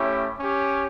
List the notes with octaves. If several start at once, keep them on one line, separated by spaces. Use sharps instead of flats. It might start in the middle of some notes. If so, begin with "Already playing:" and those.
Already playing: A3 C#4 E4 G4
C#4 G4